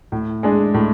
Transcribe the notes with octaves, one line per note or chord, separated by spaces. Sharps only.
A2
G#3 D4 G#4
A2